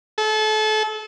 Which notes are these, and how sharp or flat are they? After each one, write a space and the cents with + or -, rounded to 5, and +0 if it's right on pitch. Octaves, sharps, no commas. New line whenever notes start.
A4 -30